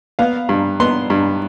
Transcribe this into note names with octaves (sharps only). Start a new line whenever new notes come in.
B3 F5
G2
B3 C6
G2